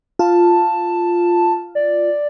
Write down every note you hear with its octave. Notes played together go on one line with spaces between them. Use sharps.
F4 A5
D5